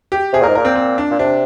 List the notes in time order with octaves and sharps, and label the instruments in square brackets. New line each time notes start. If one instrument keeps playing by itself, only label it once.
[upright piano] G4
[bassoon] C3 [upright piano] G#4
[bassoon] A#2 [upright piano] A#4
[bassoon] G#2
[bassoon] A#2 [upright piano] A#4
[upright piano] C4
C4
D4
[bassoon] A#2
[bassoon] C3 [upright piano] D4